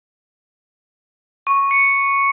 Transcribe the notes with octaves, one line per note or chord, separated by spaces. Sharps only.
C#6
C#7